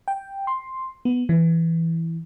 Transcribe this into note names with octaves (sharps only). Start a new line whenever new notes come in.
G5
C6
B3
E3